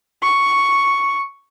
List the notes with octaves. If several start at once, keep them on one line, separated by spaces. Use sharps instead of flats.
C#6